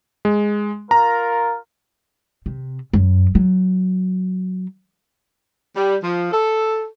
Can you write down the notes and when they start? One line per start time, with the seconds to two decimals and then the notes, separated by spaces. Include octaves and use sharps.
0.25 G#3
0.91 F4 A#4 A#5
2.46 C3
2.93 F#2
3.35 F#3
5.76 G3
6.04 F3
6.31 A4